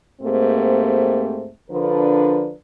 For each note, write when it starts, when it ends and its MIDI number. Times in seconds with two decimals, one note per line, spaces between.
0.22 1.48 44
0.22 1.48 57
0.22 1.48 58
0.22 1.48 60
0.22 1.48 67
1.70 2.51 50
1.70 2.51 53
1.70 2.51 62
1.70 2.51 70
1.70 2.51 71